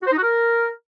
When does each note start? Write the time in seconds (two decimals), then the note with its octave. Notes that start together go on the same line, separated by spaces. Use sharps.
0.02 F#4
0.07 C5
0.12 D#4
0.18 F#4
0.23 A#4